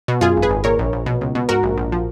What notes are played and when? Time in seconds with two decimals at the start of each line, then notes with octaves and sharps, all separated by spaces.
0.08 B2
0.21 F#2 F4 G#4
0.37 G#1
0.42 G#4 B4
0.50 G#1
0.64 A#2 A#4 C#5
0.79 A#1
0.93 A#1
1.06 B2
1.21 C#2
1.35 B2
1.49 G#2 F#4 A#4
1.63 A#1
1.78 A#1
1.92 F3